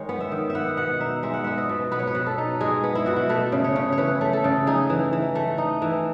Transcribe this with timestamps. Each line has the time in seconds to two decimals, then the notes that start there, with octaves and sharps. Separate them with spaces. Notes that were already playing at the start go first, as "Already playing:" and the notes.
Already playing: D#3 G#3 C#5
0.09 B3
0.21 E5
0.32 D#3
0.50 E5
0.55 B3 F#5
0.77 B2 F#5
1.00 D#4 E5
1.23 G#3 E5
1.34 F#5
1.44 B3 E5
1.58 D#5
1.69 B2
1.92 B3 B4
1.99 C#5
2.07 B4
2.15 B2
2.26 A4
2.38 D#4
2.61 G#3 G#4
2.84 B3
2.95 E4
3.06 B2 F#4
3.16 E4
3.29 A3 B4
3.52 C#3
3.64 C#5
3.76 C#3
3.92 C#5
3.98 E3 B4
4.21 A3
4.33 A4
4.44 C#3
4.67 D#4 G#4
4.90 E3
5.13 E3
5.35 A3
5.58 D#4
5.82 E3